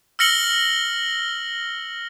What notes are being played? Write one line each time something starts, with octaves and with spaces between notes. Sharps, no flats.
E6 F6 A#6 C#7 F#7 G7